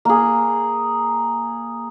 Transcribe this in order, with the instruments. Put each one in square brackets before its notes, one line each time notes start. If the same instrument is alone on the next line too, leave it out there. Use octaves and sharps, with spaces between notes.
[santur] A#3 G#4